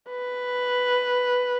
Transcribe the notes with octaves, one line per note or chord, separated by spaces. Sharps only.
B4